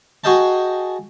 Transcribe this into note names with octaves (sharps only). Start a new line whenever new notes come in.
F#4 G#4 D#5 G5 A5